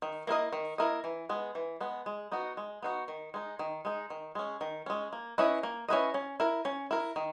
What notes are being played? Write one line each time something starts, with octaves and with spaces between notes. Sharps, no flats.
D#3
A#3 E4 A#4 D#5
D#3
A#3 E4 A#4 D#5
E3
G#3 B3
E3
G#3 B3
G#3
B3 D#4 F#4
G#3
B3 D#4 F#4
D#3
G#3 D#4
D#3
G#3 D#4
D#3
G#3 C#4
D#3
G#3 C#4
A#3
C#4 E4 B4 D#5
A#3
C#4 E4 B4 D#5
C#4
E4 A#4
C#4
E4 A#4
D#3